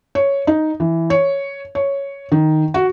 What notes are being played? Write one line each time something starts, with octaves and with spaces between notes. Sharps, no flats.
C#5
D#4
E3
C#5
C#5
D#3
F#4